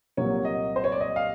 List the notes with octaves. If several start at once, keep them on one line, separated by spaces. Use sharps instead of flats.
C2 A#2 F#3 A#3 C#5
D#5
C5
C#5
D5
D#5
F5